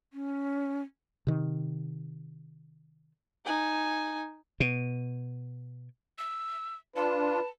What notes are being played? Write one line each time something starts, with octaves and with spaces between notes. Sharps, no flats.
C#4
C3 D#3
D#4 G#5
B2
E6
D4 F4 B4 A5